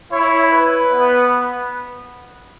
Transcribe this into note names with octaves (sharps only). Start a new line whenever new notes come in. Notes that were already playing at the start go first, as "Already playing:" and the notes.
E4 C#5
B4
B3